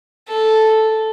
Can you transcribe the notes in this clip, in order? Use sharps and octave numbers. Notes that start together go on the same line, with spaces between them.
A4